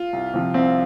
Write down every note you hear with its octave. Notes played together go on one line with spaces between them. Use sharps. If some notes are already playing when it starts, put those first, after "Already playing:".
Already playing: F4
C2
C3 F3
C2 C4